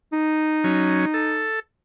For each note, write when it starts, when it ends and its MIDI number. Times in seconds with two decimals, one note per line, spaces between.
0.13 1.47 63
0.64 1.05 54
0.64 1.05 61
1.14 1.60 69